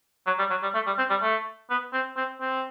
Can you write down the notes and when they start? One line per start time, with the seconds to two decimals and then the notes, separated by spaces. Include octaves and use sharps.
0.27 F#3
0.39 G3
0.50 F#3
0.63 G3
0.74 A3
0.87 G3
0.98 C4
1.10 G3
1.22 A3
1.70 B3
1.93 C4
2.17 C4
2.41 C4